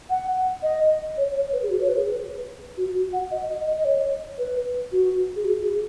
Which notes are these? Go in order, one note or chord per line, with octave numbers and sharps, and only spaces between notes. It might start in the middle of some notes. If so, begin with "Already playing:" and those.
F#5
D#5
C#5
C#5
B4
G#4
F#4
C#5
B4
G#4
B4
F#4
F#4
F#5
D#5
D#5
D#5
D#5
C#5
B4
F#4
G#4
F#4
G#4